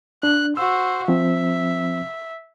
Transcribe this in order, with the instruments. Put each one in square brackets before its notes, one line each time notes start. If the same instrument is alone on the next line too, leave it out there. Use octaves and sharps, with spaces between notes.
[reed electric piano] D4 [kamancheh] F#6
[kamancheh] F#4 C5 [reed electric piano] E6
[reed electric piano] F3 C4 [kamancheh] E5